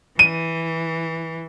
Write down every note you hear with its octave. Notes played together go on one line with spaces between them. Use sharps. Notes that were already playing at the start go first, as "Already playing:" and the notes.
E3 D#7